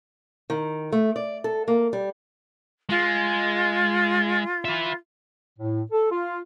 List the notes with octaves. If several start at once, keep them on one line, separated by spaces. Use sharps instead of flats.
D#3
A3
D5
A4
A#3
G3
G#3 F4
B4 E5
A2
A4
F4